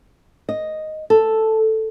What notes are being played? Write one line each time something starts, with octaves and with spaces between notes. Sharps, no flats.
D#5
A4